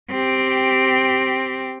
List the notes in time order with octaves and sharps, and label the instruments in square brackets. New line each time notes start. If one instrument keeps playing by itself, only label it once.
[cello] C4 G4